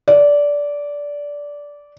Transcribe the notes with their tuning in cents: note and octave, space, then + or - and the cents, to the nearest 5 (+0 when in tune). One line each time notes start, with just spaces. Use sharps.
D5 -15